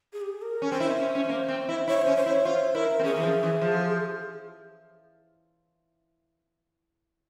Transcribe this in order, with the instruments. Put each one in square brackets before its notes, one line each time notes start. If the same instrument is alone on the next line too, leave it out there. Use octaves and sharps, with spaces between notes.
[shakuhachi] G#4
G4
G#4
A#4
[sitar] C#4
[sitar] C4 [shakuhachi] C5
[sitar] E4
C#4
C#4
C#4
A#3
C4
E4
[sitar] E4 [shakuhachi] C#5
[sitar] C#4 [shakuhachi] C5
[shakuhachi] C5
[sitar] E4
[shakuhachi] C#5
[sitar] F4 [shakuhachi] C5
[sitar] E4 [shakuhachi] A#4
[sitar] C4
[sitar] C#4 [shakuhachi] G#4
[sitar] E3
F3
E3
F3